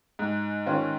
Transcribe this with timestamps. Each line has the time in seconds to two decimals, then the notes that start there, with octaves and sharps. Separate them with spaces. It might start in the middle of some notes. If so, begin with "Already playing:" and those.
0.19 G#2
0.66 D#3 C#4 F4